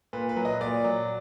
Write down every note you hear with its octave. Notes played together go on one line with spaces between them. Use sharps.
A#2 B4
B4
F#3
D#5
A#2 D5
F#3